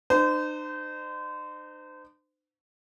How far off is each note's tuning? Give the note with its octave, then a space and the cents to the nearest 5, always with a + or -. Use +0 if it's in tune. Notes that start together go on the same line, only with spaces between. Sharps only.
D#4 -45 C5 -30